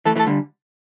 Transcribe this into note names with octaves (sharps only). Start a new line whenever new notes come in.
E3 A3 A4
E3 A3 A4
D3 G3